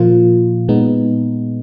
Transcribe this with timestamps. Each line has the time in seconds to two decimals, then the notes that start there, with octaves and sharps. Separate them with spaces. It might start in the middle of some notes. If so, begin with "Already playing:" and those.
Already playing: A#2 F3 A#3 F4
0.68 A#2 G#3 B3 D#4